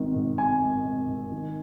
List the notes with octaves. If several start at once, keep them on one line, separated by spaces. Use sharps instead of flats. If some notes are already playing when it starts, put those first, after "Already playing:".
Already playing: G#1 D#3
G#2
G#1 G#5
G#1
G#1
G#1
D#3